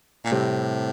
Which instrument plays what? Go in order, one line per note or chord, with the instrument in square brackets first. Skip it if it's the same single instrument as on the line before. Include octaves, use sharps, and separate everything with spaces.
[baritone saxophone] A#2
[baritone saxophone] A2 [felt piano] C3 G3 C4